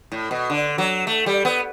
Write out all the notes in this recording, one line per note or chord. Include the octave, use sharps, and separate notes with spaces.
A2
B2
D3
F#3
A3
G3
B3